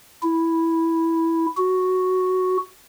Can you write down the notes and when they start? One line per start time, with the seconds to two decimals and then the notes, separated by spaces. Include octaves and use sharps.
0.23 E4
1.57 F#4